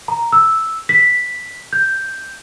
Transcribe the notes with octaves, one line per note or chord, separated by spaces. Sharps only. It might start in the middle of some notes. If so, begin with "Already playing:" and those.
A#5
E6
B6
G6